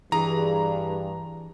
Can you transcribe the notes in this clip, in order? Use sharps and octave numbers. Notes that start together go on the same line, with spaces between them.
G2 E3 G#4 A#5